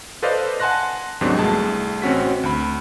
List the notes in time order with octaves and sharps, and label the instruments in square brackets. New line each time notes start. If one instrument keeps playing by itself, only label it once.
[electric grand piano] A4 B4 C5 D5 D#5 F5
F#5 G#5 A5 C6 F#6 A#6
D#2 G#2 F#3 B3 C4 D4
C2 A3 G#4 A5
A1 C4 C#4 F#4 B6
D2 B5